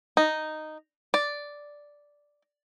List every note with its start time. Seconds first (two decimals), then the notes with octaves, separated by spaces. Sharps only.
0.17 D#4
1.14 D5